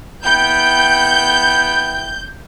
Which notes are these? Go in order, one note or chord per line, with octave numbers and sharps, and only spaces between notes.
B3 E4 G5 G6